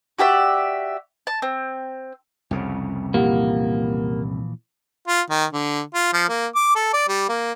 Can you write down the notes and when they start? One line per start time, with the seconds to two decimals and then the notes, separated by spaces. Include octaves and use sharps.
0.19 F#4 G4 D5 E5
1.27 A5
1.42 C4
2.51 C2 F2 C#3
3.14 A#2 E3 F3 A#3 G4 F#5
5.08 F4
5.30 D#3
5.53 D3
5.94 F4
6.13 F3
6.29 A#3
6.55 D6
6.76 A4
6.93 D5
7.08 G3
7.29 A#3